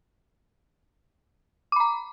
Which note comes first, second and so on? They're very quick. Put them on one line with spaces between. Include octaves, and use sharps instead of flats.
D6 B5 A#5